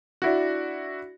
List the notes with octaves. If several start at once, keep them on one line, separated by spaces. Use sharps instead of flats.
D4 E4 F#4